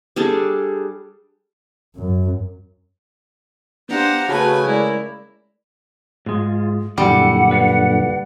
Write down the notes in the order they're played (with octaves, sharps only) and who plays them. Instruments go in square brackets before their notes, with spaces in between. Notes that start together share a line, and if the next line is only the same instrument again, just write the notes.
[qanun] G3 D4 G#4 A4
[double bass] F#2
[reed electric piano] B3 D4 [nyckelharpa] G4 C5 [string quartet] F5 F#5 A#5
[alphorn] C#3 [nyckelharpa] A3 B4 [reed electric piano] F#4 A5 B5 [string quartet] G#5
[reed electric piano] G#3 D5 [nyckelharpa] E4 [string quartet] A#4
[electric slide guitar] G#2 G#3 [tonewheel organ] F4
[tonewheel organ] F#2 A#2 D3 [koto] G3 [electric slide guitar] E4 D5 [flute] F#5
[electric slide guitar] B4 D5 F5